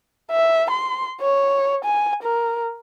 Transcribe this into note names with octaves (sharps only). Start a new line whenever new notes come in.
E5
C6
C#5
G#5
A#4